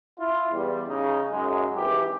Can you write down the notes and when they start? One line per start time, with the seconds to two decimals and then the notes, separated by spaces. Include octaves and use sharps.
0.19 E4 F4
0.51 E2 G3
0.87 C#3 D#4
1.31 F#2 G#3
1.76 G#1 E3 G4